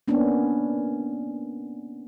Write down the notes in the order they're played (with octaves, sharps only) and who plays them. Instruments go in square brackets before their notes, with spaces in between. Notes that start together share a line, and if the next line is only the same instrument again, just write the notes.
[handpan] A#3 B3 C#4 D4